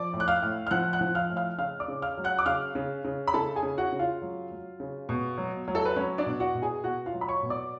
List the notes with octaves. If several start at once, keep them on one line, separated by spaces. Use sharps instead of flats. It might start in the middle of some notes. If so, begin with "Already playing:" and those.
Already playing: F3 D5 D6
A2
F#6
F5 F6
A2
F6
F3 F#5 F#6
F#5 F#6
F3
F5 F6
A2
F5 F6
C#3 F5 F6
D5 D6
C#3
F5 F6
F#3
F#5 F#6
D6
C#3 F5 F6
C#3
C#3
B5
C#3 A4 A5
G#4 G#5
C#3
F#4 F#5
C#3
F4 F5
F#3
F#3
C#3
B2
F#3
F#3
A4
B4
F#3 C#4 C#5
D4 D5
B2
F#4 F#5
B2
G#4 G#5
B2 F#4 F#5
F4 F5
F#3
B5
C#5 C#6
B2
D5 D6